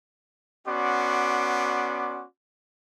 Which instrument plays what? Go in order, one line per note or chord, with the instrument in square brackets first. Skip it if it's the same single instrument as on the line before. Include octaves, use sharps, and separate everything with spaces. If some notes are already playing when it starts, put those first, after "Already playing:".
[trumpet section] B3 C#4 F#4 D5 C6 D6